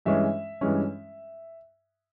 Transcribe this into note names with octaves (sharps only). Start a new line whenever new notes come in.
G2 E3 G#3 C#4 E5
G2 E3 G#3 C#4